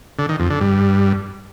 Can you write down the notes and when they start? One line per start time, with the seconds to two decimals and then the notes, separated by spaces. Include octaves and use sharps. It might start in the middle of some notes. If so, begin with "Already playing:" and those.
0.19 D3
0.29 D#3
0.40 F2
0.50 D3
0.61 G2